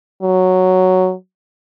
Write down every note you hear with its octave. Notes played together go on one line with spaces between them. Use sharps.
F#3